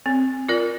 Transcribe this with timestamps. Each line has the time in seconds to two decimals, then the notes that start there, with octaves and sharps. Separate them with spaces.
0.06 C4
0.49 F4 A#4 D5